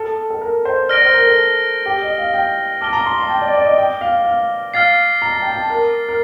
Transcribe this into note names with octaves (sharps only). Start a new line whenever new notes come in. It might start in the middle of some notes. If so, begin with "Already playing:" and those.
Already playing: A4 F6
A4
A#4
C5
D5 F6 A#6 D7 G7
C5
A#4
A4
G4
D#5
F5
G5
A5 D6 F6 A6 D7 G7
A#5
C6
A5
G5
D5
D5
D#5
G5
F5
F5
F5 F6 A6 C7
A#5
A5
G5
A5
A#4
A#4